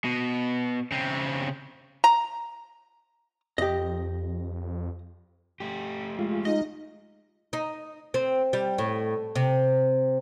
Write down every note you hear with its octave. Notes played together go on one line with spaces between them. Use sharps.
B2
C#3 C4
A#5
F2 G4 D#5
A3 G4
G#3 F4
D#4 D#5
D#4
C4
G3
A2
C3